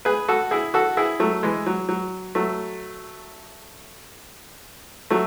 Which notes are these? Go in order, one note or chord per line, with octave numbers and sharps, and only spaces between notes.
G#4 B4
F#4 A4
E4 G#4
F#4 A4
E4 G#4
F#3 A3
E3 G#3
F#3
F#3
F#3 A3
F#3 A3